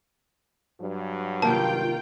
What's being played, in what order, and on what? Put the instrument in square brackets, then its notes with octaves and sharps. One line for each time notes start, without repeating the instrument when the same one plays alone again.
[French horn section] G2 F#3
[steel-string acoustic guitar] C3 D#3 A#3 [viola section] F4 G5 [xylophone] A5